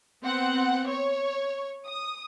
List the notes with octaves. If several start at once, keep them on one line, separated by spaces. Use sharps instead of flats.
B3 C4 F#5
C#5
D#6